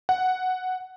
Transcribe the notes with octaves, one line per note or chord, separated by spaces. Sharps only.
F#5